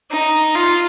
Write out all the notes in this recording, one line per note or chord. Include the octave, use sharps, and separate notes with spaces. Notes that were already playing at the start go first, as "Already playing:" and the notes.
D#4
F4